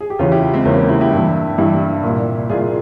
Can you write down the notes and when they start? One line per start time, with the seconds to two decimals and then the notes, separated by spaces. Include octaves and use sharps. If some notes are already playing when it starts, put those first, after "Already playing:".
0.01 G#4
0.10 G4
0.19 E2 C#3 E3 C#4 F4
0.32 E4 G4
0.54 G#3 C4
0.65 E2 C#3 E3 A#3 C#4
0.77 A#3 C#4
0.89 E4 G4
1.01 E4 G4
1.12 G2 E3
1.58 G2 E3 E4 G4
2.03 C2 A#2
2.50 C2 A#2 F4 G#4